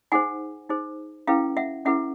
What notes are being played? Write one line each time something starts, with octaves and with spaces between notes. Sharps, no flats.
D#4 G#4 C5 F#5 G#5
D#4 G#4 C5
C#4 E4 G#4 B4 F5 G5
E5 F#5
C#4 E4 G#4 B4 E5 F#5